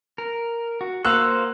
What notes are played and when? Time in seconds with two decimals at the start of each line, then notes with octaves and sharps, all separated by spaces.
0.18 A#4
0.81 F#4
1.05 A#3 F#4 C5 F5 E6 F#6